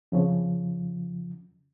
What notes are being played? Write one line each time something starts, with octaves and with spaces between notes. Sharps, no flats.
F2 C#3 F3